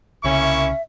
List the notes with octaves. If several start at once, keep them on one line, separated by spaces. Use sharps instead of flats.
C2 C#3 A#3 C#4 E4 E5 C#6